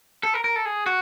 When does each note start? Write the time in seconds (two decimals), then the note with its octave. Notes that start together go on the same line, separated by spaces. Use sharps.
0.23 A4
0.34 A#4
0.44 A#4
0.56 A4
0.65 G#4
0.86 F#4